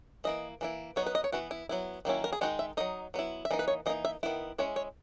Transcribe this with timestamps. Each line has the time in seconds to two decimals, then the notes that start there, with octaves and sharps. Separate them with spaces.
0.24 E3 A#3 E4 D#5
0.61 E3 A#3 E4
0.96 F#3 B3 D#4 C#5
1.06 B4
1.15 D#5
1.24 C#5
1.32 E3 B3 E4 F#4
1.51 E4
1.69 F#3 B3 E4
2.05 D#3 F#3 A#3 C#4 E4
2.24 A#4
2.33 G#4
2.41 D#3 G#3 D#4 F#4
2.59 E5
2.77 F#3 A#3 D#4 D#5
3.14 F#3 B3 E4
3.45 E5
3.51 E3 A#3 D#4 D#5
3.59 B4
3.68 C#5
3.86 E3 A#3 D#4 D#5
4.05 E5
4.23 D#3 G#3 B3 E4
4.58 G#3 C#4 E4 C#5
4.76 C#5